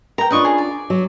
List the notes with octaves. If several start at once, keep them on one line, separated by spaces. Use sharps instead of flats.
A#4 G5 A#5
C#4 D4 F4 B4 D#5 C#6
G#4 A#4
D5
F#3